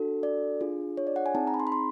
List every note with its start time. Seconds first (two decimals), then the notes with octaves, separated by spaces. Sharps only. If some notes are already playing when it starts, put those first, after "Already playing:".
Already playing: D4 F#4 A4
0.23 D5
0.60 D4 F4 G#4
0.97 C#5
1.07 D5
1.16 F#5
1.26 G#5
1.35 C4 D#4 G#4 A5
1.47 A#5
1.54 B5
1.60 C6
1.67 B5
1.72 C6